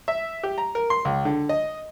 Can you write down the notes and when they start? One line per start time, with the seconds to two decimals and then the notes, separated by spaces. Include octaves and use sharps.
0.08 E5
0.43 G4
0.58 A#5
0.75 A#4
0.90 C6
1.05 C#2
1.25 D3
1.49 D#5